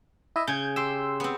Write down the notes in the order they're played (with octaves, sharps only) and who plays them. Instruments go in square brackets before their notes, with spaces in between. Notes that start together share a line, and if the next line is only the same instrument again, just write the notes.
[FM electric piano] E4 D#5 E5
[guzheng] C#3 [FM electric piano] G6 G#6
[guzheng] G4 [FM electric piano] C6 E6
[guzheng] B3 C4